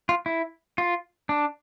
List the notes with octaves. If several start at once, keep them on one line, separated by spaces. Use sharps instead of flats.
F4
E4
F4
D4